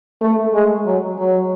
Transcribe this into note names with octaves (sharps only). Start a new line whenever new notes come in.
A3
G#3
F#3
F#3